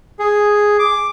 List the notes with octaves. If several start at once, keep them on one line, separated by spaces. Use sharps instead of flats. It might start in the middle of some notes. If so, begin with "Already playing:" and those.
G#4
D6